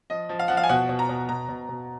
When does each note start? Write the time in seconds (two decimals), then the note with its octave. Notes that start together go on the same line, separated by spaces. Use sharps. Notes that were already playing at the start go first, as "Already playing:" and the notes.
0.10 F3 D#5
0.29 F3
0.39 F5
0.48 F3 F#5
0.57 F5
0.64 G#5
0.69 B2 F#5
0.89 B2
0.99 A#5
1.09 B2
1.29 B2 A#5
1.48 B2
1.69 B2